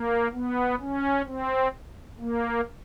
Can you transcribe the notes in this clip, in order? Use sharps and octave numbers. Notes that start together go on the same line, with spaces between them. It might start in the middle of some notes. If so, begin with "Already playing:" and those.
Already playing: A#3
B3
C#4
C4
A#3